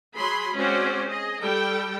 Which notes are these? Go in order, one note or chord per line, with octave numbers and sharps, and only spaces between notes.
F#3 G#4 B5 C6
G#3 C4 C#4 F#4 C5 D5
G#4 D#5
G3 A4 G5